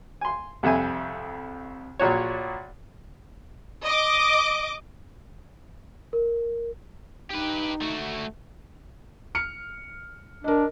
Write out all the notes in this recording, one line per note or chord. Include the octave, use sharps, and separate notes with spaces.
G#5 C6
C2 F2 E5 G#5
A#1 A#2 F#4 C#5
D#5 D6
A#4
D#4 G4 B4
A3 F#4
F6 C#7
D4 A#4 D#5